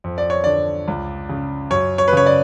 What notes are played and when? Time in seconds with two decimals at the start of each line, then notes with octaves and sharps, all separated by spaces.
0.04 F2
0.18 D5
0.30 C#5
0.44 D3 D5
0.88 C#2
1.29 C#3
1.70 F#2 C#5
1.98 C#5
2.08 B4
2.13 C#3 C#5
2.26 D5